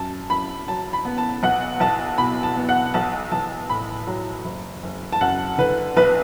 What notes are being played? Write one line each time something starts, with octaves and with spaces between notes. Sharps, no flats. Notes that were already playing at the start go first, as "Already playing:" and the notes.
Already playing: F#2 A5
F#2 B5
F#3 A5
B5
B3
A5
B1 F#5
B1 A5
B2 B5
A5
B3
F#5
B1 A5
B1 A5
A2 B5
F#3
F#1
F#1
A5
F#2 F#5
D3 B4
B1 B4